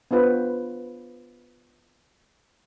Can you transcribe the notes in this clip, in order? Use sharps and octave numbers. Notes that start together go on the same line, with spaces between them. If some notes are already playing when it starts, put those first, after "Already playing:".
B3 D4 F4 B4 C5